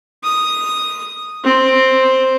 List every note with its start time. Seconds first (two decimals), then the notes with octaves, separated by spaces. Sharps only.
0.23 D#6
1.44 C4